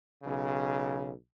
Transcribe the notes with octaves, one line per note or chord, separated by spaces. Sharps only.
B1 C#3